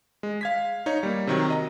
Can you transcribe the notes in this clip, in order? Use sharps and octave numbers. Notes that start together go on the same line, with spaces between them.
G#3
F5 G#6 B6
D#4 C#5
G3 A#3
C3 D#3 F#3
D#5 A#5